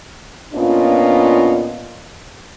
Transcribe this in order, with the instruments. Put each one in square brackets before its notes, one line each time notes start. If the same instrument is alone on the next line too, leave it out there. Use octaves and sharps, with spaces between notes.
[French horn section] A#2 B3 C#4 D4 F4 D#5